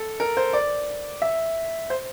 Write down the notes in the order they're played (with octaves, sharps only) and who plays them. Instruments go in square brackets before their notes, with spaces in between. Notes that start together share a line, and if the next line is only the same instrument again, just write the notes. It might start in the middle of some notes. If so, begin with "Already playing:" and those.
Already playing: [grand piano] A4
A#4
C5
D5
E5
C5